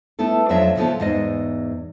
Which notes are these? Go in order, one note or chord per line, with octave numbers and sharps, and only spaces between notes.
A3 B3 E4 A4
F2 F#3 D4 F4 D#5 E5
A#2 C#3 E3 F3 B3 A4
E2 G#2 D#5